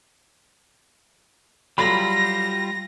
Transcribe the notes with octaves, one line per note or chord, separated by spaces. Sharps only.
F#3 G3 F4 A4 B5 A#6 F#7